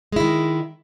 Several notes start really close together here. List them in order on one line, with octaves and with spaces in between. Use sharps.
G#3 E4 D#3